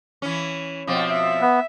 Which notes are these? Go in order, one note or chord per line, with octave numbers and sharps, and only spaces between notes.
E3 C#4
B2 F3 C4
E5
B3